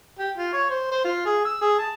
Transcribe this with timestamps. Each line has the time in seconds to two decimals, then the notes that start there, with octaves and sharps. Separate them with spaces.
0.19 G4
0.37 F4
0.53 C#5
0.69 C5
0.91 C5
1.04 F4
1.25 G#4
1.45 E6
1.61 G#4
1.78 A5